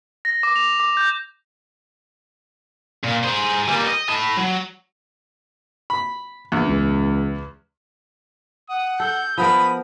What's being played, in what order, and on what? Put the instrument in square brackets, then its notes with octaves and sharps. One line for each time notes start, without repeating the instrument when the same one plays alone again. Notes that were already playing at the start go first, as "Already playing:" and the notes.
[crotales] A#6
D6
F7
D6
G6
[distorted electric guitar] A#2
G#4 C5
G3 A#3
D#5
E4 A5
F#3
[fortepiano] B5
[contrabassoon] A#1 [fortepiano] E2
[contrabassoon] C#2
[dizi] F#5 [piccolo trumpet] D#6
[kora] A4 [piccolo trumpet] G6
[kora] F3 B3 A#4 [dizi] B5 [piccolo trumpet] D#6